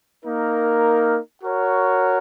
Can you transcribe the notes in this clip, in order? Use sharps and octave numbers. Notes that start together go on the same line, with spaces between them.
A#3 D#4 A#4
F#4 A#4 C#5